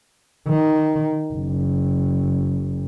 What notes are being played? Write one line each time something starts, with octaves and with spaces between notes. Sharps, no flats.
D#3
F#1